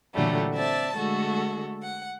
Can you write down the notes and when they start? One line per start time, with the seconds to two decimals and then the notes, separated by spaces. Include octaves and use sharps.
0.14 A#2 D3 E3 F#3 G3 A3
0.53 C4 D5 E5 A5
0.94 D3 G#3 A3 F#4 A4
1.83 F#5